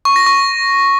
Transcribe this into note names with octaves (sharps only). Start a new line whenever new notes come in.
C#6
A#6
C#6